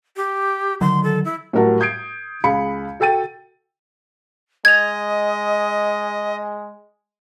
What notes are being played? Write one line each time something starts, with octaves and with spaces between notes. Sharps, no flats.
G4
D3 D#3 F#3 C6
A4
E4
A2 F#3 G3 A#4 F#5 A5
D#6 G6 G#6 C7 D7
C#2 G#4 B5 C#7
F#4 A4 G5 A6 D#7
G#3 D#5 G#6 F7